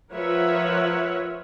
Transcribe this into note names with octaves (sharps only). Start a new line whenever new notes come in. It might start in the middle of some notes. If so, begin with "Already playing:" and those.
F3 A#4 B4 C#5 E5 F#5